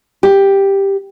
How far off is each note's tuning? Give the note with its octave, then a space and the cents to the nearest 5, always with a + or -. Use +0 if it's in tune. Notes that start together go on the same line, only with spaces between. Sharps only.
G4 +5